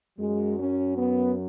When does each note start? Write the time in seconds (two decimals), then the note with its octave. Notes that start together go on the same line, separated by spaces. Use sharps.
0.19 F#2 F#3 G#3
0.60 C#4
0.98 B3